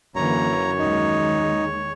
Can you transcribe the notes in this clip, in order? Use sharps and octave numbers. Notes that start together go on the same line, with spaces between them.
F#2 D3 E3 A#3 C#5 A#5
D#2 D#3 G#3 D#4